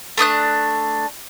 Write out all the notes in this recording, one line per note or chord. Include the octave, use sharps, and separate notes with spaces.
A3 D4 D#6 F#6